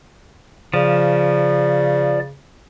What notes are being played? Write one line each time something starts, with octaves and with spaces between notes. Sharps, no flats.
C#3 F3 D5